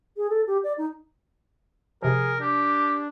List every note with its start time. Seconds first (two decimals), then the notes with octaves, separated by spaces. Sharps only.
0.17 G#4
0.30 A4
0.47 G4
0.64 D5
0.78 D#4
2.03 C3 F3 G#4 A#4
2.40 D4 G4